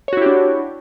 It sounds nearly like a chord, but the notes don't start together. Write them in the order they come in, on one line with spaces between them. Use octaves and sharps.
C#5 F#4 E4 G4 D4